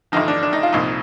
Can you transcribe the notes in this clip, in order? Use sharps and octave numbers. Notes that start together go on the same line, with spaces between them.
A1 G2 D3 F3 D#4
D4
D4
D#4
F4
C2 A#2 F3 D#4